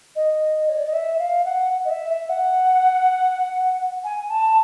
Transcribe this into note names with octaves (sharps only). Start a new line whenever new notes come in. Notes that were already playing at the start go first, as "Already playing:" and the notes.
D#5
C#5
D5
D#5
E5
F5
F#5
D#5
E5
E5
F#5
G#5
A5